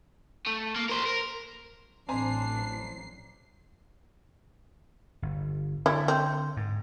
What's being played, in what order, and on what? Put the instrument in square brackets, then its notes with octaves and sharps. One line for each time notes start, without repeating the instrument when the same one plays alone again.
[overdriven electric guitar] A3
A#3
A#4 C5
A#4
[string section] A1 F#3 C7 [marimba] C4 [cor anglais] D4 [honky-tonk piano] C5 G#5 A#5
[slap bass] G1
[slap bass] D3 [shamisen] E4
[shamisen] C4
[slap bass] G#2